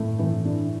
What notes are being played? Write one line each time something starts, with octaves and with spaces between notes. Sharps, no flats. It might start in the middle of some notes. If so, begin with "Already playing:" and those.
Already playing: A2 A3
E3
D4